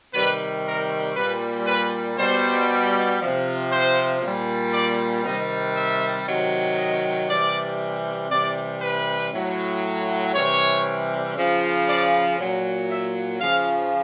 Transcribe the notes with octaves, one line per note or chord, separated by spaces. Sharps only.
C3 D#3 G3 B4
A#4
A#2 G3 B4
B4
B2 G3 C5
C3 F3
C5
A#2 G3
D5
C3 D#3 G3 D#5
E5
C3 D#3 F#3
D#5
C3 E3 G3 D5
C3 E3 G3 D5
B4
A2 F#3
C3 E3 G3 C#5
C#3 F3
D5
A#2 F#3
E5
C#3 F3 F5